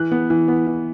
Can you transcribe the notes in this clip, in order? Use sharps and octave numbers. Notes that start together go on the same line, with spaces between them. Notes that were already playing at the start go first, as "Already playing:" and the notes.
Already playing: E3 F#6
B3
E3
B3
E3